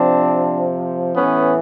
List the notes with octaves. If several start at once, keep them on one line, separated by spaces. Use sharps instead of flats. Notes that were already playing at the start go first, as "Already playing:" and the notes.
Already playing: C3 F3 C4 D4
A2 E3 B3 C#4